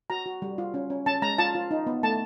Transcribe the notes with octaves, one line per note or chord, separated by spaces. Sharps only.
F#4 A#5
F#4
G3
F4
C#4
C#4
C#4 A5
G#3 A#5
F4 A5
F4
D#4
B3
A3 A5